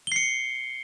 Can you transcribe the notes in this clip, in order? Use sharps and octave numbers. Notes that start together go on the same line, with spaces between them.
C7 C#7 G7